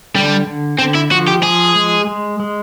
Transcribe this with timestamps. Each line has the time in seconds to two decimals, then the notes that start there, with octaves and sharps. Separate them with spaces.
0.15 D3 G3
0.47 D3
0.79 D3 C4
0.95 E4
1.12 F3 F#4
1.28 G4
1.43 F3 G#4
1.75 G#3
2.07 G#3
2.40 G#3